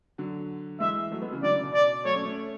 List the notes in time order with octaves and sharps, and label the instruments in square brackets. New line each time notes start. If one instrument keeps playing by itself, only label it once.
[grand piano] D3 F#3
[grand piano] E3 G#3 [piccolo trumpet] E5
[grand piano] F#3 A3
G#3 B3
C#3 E3
[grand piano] D3 F#3 [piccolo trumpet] D5
[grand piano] C#3
B2
[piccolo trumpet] D5
[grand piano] F#3 A3 [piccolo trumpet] C#5
[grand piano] A3 C#4
A3 C#4